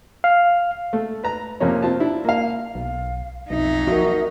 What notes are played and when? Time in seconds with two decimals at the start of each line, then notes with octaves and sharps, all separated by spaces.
0.24 F5
0.93 A3
1.24 B4 A#5
1.60 F2 C3 A#3 C#4
1.82 C4 F4 A5
2.00 D4 E4
2.25 A#3 F5
2.75 B1 F5
3.50 B1 F2 D#4 E5
3.87 F3 F#4 A#4